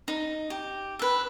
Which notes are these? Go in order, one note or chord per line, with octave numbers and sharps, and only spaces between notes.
D#4
G4
A4 B4